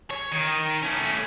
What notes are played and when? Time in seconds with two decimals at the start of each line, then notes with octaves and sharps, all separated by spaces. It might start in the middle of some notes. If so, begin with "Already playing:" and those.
0.11 C#5
0.32 D#3
0.83 A3 C#4